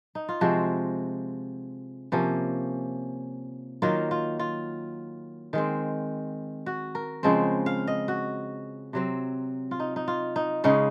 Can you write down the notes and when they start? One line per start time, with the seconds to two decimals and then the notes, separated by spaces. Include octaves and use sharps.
0.15 D#4
0.29 F4
0.41 C3 F3 G#3 C4 F#4
2.12 C3 F3 A#3 C#4
3.82 D#3 F#3 A#3 F4
4.11 F4
4.39 F4
5.53 D#3 G#3 C4
6.66 F#4
6.95 A#4
7.23 C#3 F3 G#3 C4
7.66 F5
7.88 D#5
8.08 F#4
8.93 C3 F#3 C4
9.71 F4
9.80 D#4
9.96 D#4
10.08 F4
10.36 D#4
10.64 C#3 G#3 C#4 D#4